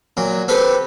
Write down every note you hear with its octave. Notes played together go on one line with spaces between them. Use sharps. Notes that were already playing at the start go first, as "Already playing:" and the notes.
A#2 F#3
C4 G4 A4 B4